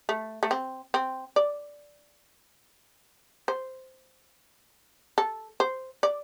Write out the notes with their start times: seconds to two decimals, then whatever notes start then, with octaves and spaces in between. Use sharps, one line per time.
0.09 A3
0.43 A3
0.51 C4
0.94 C4
1.36 D5
3.48 C5
5.18 A4
5.60 C5
6.03 D5